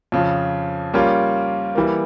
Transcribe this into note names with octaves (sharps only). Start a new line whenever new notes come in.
F2 C#3 F3
G3 A#3 C#4 F4
E3 G3 A#3